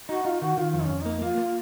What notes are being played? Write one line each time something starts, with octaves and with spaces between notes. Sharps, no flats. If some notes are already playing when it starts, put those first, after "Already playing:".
D#4 F#4
D#4 F4
D#3 F#4
D#3 F4
F2
D#4
C#4
F2
A#3 D#4
A#3 F4
A#3